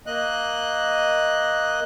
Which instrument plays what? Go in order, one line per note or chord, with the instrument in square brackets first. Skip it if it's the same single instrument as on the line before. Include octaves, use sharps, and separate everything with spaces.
[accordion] A#3 D#5 F#6